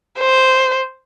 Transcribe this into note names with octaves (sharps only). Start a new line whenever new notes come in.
C5